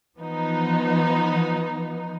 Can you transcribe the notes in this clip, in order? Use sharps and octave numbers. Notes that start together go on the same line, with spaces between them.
E3 F3 B3 D#4